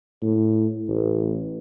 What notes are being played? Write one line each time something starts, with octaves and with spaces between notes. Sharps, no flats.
A2
A1